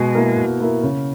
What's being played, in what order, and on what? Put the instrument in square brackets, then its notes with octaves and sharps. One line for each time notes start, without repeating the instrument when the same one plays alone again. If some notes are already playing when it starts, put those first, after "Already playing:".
Already playing: [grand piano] B2 [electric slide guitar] G#3
[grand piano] A#3 E4 A#4
B2
A#3 E4 A#4
C#3